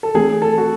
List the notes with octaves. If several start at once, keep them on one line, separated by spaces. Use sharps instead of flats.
A4
E3 A3 C4 G#4
A4
F#4